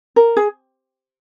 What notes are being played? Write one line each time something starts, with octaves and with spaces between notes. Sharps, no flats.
A#4
G#4